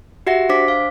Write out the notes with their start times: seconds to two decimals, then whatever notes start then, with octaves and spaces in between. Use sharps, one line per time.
0.27 F#4 G4 E5 F#5 A#6
0.49 D4 C5 D6 B6
0.68 F5